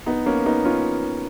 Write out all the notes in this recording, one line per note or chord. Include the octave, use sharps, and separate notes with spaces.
B3 D#4
A#3 C#4
B3 D#4
C#4 F4